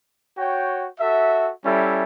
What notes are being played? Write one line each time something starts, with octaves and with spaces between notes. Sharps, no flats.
F#4 C#5 G5
F#4 A4 E5
G3 C#4 E4 A4 E5